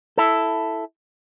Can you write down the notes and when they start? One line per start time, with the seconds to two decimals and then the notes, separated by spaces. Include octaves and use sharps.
0.18 E4 A4